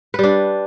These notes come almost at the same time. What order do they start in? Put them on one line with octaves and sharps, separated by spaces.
B4 G3 D4